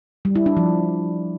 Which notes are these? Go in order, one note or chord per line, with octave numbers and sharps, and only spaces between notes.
G3
E4
D4
F3